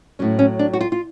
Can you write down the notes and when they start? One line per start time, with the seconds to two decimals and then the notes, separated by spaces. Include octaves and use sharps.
0.19 A2 F#3 C#4
0.39 C#4
0.59 D4
0.74 F#4
0.81 F4
0.92 F4